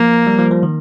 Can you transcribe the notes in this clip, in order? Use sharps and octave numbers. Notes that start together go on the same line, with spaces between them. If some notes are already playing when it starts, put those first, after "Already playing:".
Already playing: F3 A#3
G3
F3
F3
D#3